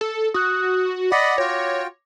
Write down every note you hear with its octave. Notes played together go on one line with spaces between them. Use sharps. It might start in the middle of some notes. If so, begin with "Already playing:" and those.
A4
F#4 D#6 F#6
D5 D#5 F#5 B5 D6 A#6
F4 F#4 C#5 G5